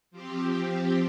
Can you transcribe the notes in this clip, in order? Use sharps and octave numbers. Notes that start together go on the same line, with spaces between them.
F3 C4 G4